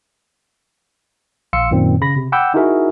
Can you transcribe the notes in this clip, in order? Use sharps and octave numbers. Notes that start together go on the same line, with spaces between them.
A#1 F5 C6 E6 C#7
F#2 A#2 D#3 C4
C#3 B5 A#6
C3
F#5 G5 B5 D6 E6 G6
D#4 E4 F#4 G#4 A#4 E5